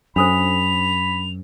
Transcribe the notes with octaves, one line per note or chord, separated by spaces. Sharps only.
F#2 D4 A4 C5 B5 F7